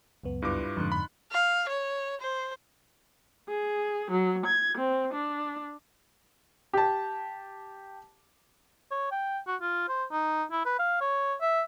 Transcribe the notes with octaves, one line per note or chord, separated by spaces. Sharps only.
C#2 F#2 B3
G2 E4 F4 B4 D6
F2 G#2 D3 D#4 C6 F#6
B5
F5
C#5
C5
G#4
F#3
G#6
C4
D4
G4 A5
C#5
G5
F#4
F4
C5
D#4
E4
B4
F5
C#5
E5